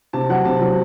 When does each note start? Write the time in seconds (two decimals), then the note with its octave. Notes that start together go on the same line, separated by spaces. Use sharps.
0.13 C3 A5
0.29 F#3 F#5
0.45 C3 A5
0.61 F#3